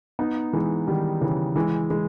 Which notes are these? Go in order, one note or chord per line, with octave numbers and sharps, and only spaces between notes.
B3 D#4
E3 G#3
D#3 G3
C#3 E3
E3 G#3
E3 G#3